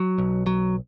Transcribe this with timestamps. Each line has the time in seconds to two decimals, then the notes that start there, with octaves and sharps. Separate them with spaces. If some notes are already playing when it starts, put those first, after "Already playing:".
Already playing: F#3
0.18 B1
0.47 F#3